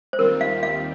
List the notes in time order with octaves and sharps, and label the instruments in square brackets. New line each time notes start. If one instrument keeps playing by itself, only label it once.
[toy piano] C5
[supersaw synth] D#2 D#3 G3 C4 F4 [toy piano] A#4
[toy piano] F5
F5